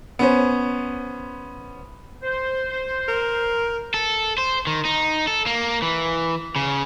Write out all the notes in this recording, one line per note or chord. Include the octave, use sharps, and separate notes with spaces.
B3 C#4 C5
C5
A#4
A4
C5
D#3
D#4
A4
A#3
E3
C#3